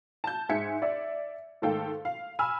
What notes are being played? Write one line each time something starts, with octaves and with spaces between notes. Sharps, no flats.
A5 G6
G#2 G#4 E5 G#6 B6 C#7
D5 E5
G#2 D#3 A3 A4 F5 G5
F5
G#5 B5 E6 F6